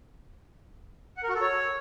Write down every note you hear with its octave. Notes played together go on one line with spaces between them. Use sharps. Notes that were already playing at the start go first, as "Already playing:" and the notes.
F#5
A#4
F#4
A4
C#5